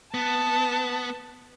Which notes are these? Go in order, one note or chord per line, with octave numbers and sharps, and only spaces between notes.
B3 A5